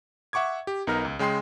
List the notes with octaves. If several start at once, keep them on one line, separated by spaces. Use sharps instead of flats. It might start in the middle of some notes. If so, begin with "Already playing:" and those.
E5 F#5 C#6 D6 G#6
G4
B1 B3 D#4 A#4 A#5 F6
C#2
C#3 G#3 G5 C6 C7